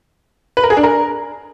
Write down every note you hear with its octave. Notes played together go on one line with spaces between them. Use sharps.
B4
A#4
G#4
D4
A#4